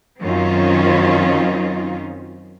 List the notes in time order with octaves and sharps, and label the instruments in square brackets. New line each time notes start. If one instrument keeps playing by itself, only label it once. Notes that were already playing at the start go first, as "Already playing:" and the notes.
[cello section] F#2 D#3 C4 C#4 D#4 F4